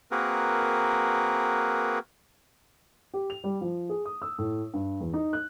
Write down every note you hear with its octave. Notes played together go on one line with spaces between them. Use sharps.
A#3 C4 F#4 G#4 A#4 B4
G4
F7
G3
F3
G#4
D#6
E6
A2
G2
E2
D#4
F#6